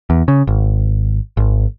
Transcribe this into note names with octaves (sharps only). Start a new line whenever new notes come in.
E2
C#3
G#1
G#1